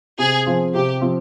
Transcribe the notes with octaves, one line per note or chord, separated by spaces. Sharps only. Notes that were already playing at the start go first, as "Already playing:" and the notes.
C3 G#4
F3 C4 F4
C3 G4
F3 C4 F4